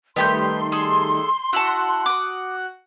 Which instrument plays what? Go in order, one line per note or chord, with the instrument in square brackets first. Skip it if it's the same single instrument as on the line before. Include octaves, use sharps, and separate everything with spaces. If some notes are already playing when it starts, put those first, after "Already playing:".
[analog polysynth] D#3 G3 A3 [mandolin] B3 G4 G6 [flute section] C6
[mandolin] G#4 A4
[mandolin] E4 A5 [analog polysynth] F#4 F#5
[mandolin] D6 D#6